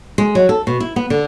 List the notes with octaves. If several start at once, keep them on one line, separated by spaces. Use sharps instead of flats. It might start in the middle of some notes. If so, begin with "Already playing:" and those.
G#3
F#3
A4
B2
E4
B3
D3